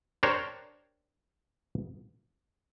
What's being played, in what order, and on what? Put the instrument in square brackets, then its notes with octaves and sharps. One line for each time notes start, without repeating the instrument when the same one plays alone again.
[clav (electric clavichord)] D4 G4 A#4 C5 C#5